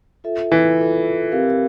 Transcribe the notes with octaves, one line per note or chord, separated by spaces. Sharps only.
F4 A4 E5
E3
F4 A4 E5
C4 G4 A#4 F5